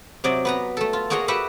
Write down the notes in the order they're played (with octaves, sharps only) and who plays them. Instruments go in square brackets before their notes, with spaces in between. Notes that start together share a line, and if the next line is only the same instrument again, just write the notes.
[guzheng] C3 F#3 D5 D#5
B3 B4 A#5
A3 A4
F4
A#3 F#4 G#4 C#5 D#5 A#5
F#4 G4 B4 E5 F#5